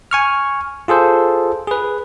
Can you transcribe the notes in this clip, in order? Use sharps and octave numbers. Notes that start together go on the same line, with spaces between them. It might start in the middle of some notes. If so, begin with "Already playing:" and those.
G#5 C#6 F6
F4 G#4 A4 C5
G#4 B4